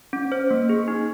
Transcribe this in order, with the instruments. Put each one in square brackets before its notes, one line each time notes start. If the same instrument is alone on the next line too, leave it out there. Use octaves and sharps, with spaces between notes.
[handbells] C#4
C5
A#3
G#4
D#4